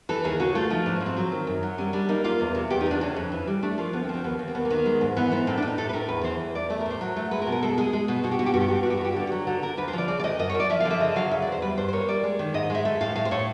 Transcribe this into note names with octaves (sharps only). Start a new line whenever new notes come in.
E3 A4
D#2 G#4
C#3 F#4
A3 F4
F3 D#4
G#2 D4
C#4
F3
C4
F#3
D#3
F#2
F#3
G3 C#4
G3 D4
A#3 D#4
A#3 F4
E2
C3
E2 G4
D#4
E2
D4
C#3 C#4
F2
E3
G3
A3 D4
F3 A#3
D2 B3
C4
F3
C4
D#2 B3
D#2
C4
D#2 B3
A#3
D#3 B3
G#3
G#2
E3 B3
G#2 B3
A2 C4
D4
A2
D#4
A2 A4
B4
A2 A#4
E2 B4
E3 C5
E2
E2 D5
A3 E5
A#4
A2
C5
F#3
A3
G#3 B4
A#4
B2
A#4
G#3 A4
G#3 G#4
G#3
B2
B2 F#4
G4
B2 F#4
G4
G2 F#4
G4
G2 F#4
G4
F#4
E3 G4
F#4
G2 G4
F#4
D3 G4
F#3 F#4
D3 F#4
D3 A#4
D2 B4
C5
F3 D5
C#3 D5
D5
D2 D#5
F#2 D#5
C#5
F#2
D5
F3 E5
F5
D3
E5
C#3 D#5
F#3 F5
C#3 E5
D5
E2 C5
G3 B4
G2 C5
C5
A#3 C#5
G3 D5
G#3
D#3
G#2 D#5
G#3 E5
A3 E5
A2 F5
A2 F5
C5
A2 C#5